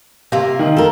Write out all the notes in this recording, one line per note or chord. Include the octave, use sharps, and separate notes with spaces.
C3 A#3 F4
D#3
A4 A#4